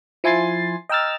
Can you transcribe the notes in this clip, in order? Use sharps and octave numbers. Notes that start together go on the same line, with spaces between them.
F3 E4 G#5 C6 A6 C7
D#5 G5 A#5 E6 F6 A6